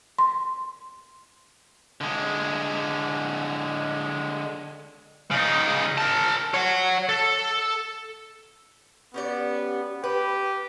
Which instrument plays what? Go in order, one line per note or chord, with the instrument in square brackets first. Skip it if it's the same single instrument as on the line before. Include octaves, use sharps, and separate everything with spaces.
[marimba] C6
[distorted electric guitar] D3 G#3
C#3 D#4
A#4 A5
C#5 F#5
A4
[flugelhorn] B3 [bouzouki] C#4 G4 D5
[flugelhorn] G4 [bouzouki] B4